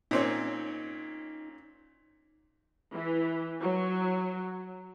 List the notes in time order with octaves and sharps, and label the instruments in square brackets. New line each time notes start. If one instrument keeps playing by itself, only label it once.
[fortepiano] A#2 C4 C#4 [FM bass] D#4
[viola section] E3
F#3